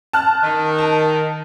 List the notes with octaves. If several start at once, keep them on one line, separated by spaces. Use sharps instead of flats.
A5 F6 F#6
D#3
A5